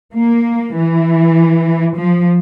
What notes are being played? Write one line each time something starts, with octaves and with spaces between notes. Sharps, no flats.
A#3
E3
F3